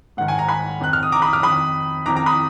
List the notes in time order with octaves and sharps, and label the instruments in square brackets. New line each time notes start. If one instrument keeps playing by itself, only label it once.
[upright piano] G#2 D#3 F#5
G#5
A#5
G#5 B5
F2 D#3 F#6
F6
D#6
A#5 D6
B5 D#6
D6 F6
F2 D#3 B5 D#6
F2 D#3 A#5 D6
A#5 D6
B5 D#6